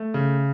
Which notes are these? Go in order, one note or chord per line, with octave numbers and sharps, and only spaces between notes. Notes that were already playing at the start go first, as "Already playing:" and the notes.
Already playing: A3
C#3